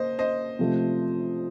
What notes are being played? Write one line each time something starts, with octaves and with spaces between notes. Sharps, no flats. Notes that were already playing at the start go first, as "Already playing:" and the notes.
Already playing: A#3 C5 D#5
C5 D#5
C3 F3 A3